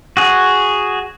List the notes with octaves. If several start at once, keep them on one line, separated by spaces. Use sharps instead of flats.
F#4 G#4